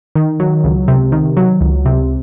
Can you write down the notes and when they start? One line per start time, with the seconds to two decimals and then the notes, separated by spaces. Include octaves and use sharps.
0.15 D#3
0.40 F#3
0.64 C#2
0.88 C3
1.12 D#3
1.37 F#3
1.61 C#2
1.85 C3